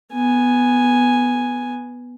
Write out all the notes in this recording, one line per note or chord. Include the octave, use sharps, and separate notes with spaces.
B3 G#5